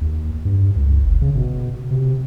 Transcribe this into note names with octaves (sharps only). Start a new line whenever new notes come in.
D#2
G2
C#2
F#1
C#3
B2
C3